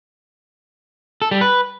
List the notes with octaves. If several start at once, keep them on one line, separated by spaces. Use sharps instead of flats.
A4
G3
B4